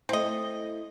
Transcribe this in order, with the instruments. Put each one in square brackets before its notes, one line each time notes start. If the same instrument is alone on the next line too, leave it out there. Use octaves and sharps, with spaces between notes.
[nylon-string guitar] A3 E4 [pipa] C4 D#5